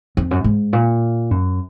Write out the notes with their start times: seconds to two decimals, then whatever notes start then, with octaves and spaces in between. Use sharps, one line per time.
0.17 F2
0.31 F#2
0.44 G#2
0.73 A#2
1.31 F#2